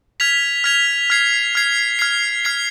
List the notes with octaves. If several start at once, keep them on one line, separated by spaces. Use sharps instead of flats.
F6 G#6 B6 F7
F6 G#6 B6 F7
F6 G#6 C7
F6 G#6 C7
F6 G#6 C7
F6 G#6 C7